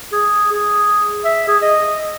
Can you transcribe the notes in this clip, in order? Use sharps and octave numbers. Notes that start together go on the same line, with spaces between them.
G#4
G#4
E5
G#4
D#5